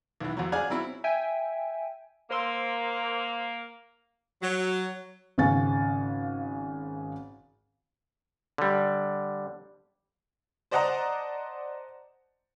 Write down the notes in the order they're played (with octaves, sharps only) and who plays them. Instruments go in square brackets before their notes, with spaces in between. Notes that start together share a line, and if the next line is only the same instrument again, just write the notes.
[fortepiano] B1 E3
F2 F#3
G#4 D5 F5 F#5 G#5
F#3 C4 E4
[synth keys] E5 G5 G#5
[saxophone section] A#3 [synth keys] C5 C6 E6
[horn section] F#3
[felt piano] G#1 C#3 F5 G#5 C#6 A6
[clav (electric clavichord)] D3 G3
[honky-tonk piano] C5 D5 D#5 F#5 A5 A#5